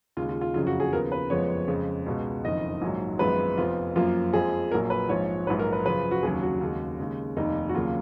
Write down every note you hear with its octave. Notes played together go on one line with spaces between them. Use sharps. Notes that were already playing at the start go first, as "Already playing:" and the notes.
D#2 C#3 G#3 F4
F4
F4
F#1 F2 C#3 F#3 F4
F#4
G#4
D#2 C#3 F3 B3 A#4
B4
F#1 F2 F3 G#3 B3 C#5
F2 C#3 G#3
C#2 B2 G#3
F#1 F2 D#3 D#5
A#1 G#2 D#3 F#3
G#1 F#2 F3 G#3 B3 B4
F1 F2 F3 B3 F4
F#2 F3 A#3 F4
F2 F3 G#3 G#4
A#1 A#2 F#3 A#3 A#4
B4
A#1 G#2 F3 C#5
A#1 G#2 F#3 B4
A#4
B4
F#2 C#3 F3 B4
F#4
F1 D#2 C#3 F#3 G#4
F#4
D#2 C#3 G#3
D#2 C#3 G#3
F1 D#2 D#3 A#3 D#4
F#4
D#2 C#3 F#3 A#3 F4